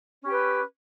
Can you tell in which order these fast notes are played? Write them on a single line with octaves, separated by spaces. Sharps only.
C#4 G4 B4